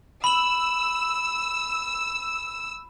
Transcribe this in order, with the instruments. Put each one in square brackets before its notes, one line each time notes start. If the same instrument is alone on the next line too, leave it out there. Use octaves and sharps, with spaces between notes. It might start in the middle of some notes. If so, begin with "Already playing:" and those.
[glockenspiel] B5 F#7 [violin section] E6